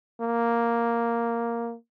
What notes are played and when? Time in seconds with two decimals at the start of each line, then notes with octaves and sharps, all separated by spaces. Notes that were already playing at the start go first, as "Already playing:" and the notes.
0.21 A#3